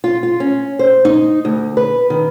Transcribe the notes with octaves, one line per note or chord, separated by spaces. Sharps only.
F4
F4
C#4
C5
D#4
D2
B4
D#3